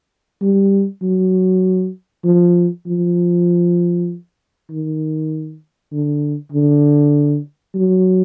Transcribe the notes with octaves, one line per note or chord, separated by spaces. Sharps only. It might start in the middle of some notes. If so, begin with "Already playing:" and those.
G3
F#3
F3
F3
D#3
D3
D3
F#3